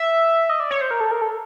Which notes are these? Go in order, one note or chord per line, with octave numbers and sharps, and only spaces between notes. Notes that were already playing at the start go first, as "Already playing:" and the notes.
Already playing: E5
D#5
D5
C#5
C5
A#4
A4
A#4
A4